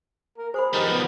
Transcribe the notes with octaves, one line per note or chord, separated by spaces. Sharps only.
A#4
G#4 C5 B5
F3 G3 D#4 G4 A#4 B4
B3